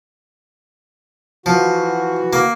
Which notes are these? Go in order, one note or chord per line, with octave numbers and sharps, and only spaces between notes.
E3 F3 F#4
A#3